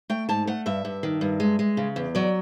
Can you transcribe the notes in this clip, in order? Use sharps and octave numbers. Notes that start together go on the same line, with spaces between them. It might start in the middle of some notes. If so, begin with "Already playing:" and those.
A3 G5
G#2 A5
A3 F#5
G2 E5
G2
D#3
G2
G#3
G#3
C#3
E2
F#3 D5